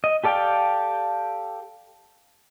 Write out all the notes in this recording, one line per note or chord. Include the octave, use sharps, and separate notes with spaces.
D#5
G4 A4 D5 F5 G5